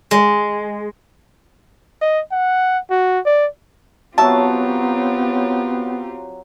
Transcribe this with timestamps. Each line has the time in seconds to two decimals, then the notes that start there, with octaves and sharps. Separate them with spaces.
0.11 G#3
2.02 D#5
2.32 F#5
2.90 F#4
3.25 D5
4.18 F#3 B3 C4 F4 G4 C#5 E5 A5